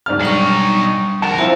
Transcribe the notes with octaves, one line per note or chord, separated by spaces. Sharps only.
G#2 D5 A5 F6
B1 G3 D4 D#4 C#6
F2 A#4 F#5 A5
E3 C4 F4 F5